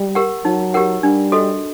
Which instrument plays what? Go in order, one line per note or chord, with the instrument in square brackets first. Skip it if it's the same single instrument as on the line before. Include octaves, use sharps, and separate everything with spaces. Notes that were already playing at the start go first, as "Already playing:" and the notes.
Already playing: [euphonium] G3
[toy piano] G4 A#4 F#5
[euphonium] F#3 [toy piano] D#4
[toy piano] G4 A#4 F#5
[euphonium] G3 [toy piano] D4
[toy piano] F#4 A4 D#5